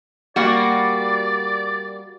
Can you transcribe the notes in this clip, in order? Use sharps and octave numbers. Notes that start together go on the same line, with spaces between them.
G3 A#3 F#4 D5